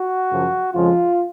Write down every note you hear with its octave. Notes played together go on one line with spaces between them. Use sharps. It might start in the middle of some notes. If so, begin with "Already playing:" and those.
Already playing: F#4
F#2 C#3 F3
F2 C#3 F3 G#3 F4